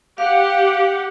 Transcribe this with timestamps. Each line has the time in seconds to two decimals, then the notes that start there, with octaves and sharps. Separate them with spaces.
0.18 G4 F5 F#5